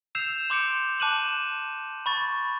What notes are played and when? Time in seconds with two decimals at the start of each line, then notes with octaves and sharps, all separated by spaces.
0.15 E6 G6 C7 E7 F7
0.50 C6 D6 G6 C#7 D7
1.00 A5 D6 F#6 D#7 E7 F#7
2.06 B5 C#6 A6